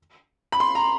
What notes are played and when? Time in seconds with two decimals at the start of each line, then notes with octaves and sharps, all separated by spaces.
0.52 B5
0.60 C6
0.75 A#5